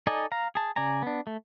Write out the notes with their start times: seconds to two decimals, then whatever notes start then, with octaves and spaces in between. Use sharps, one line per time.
0.07 D#4 A4 D5 D#5 G#5
0.32 F5 A#5
0.55 G#4 A5
0.76 C#3 D5 G#5 A#5
1.02 B3 D4
1.27 A3